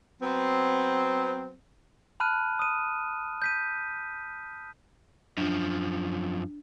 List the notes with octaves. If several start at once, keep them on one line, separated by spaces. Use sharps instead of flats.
F#3 B3 C4
A5 B5 F6 F#6 D#7
D#6 D#7
G6 B6 D#7
F#2 F3 D4